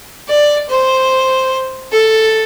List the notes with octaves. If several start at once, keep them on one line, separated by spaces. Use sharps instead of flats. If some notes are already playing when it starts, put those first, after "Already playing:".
D5
C5
A4